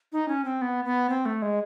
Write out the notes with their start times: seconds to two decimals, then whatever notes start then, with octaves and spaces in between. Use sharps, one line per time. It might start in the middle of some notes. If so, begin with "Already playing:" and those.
0.13 D#4
0.28 C#4
0.45 C4
0.62 B3
0.85 B3
1.10 C4
1.26 A3
1.42 G#3